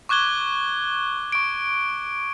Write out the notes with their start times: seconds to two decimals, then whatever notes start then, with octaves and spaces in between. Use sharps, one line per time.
0.09 C#6 D6 F#6 G#6 G7
1.32 C#6 D7